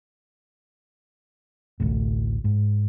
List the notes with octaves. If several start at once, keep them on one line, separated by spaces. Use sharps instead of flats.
A1 D2 A2
G#2